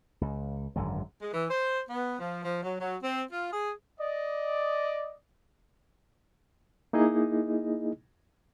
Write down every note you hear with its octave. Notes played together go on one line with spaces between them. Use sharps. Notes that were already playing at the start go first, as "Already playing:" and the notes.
C#2
G#1 F#2 D3 G#3
G#3
E3
C5
B3
F3
F3
F#3
F#3
C4
F4
G#4
D5 D#5
A#3 D#4 E4 G#4 D#5